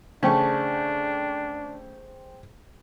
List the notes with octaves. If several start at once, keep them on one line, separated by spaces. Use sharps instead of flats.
C#3 A3 D4 G#4 C5 G5 A5 C#6